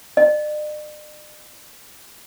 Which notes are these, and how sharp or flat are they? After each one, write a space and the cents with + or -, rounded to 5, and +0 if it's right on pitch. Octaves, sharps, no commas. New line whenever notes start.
D5 +45